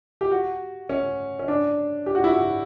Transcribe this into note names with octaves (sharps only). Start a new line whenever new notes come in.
G4
F#4
C#4
C#4
D4
G4
F#4
E4
F#4